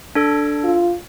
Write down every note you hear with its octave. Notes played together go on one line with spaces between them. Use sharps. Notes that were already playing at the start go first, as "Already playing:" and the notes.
D4 A4
F4